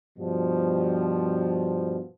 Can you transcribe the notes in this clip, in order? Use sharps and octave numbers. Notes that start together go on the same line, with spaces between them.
G2 B2 F3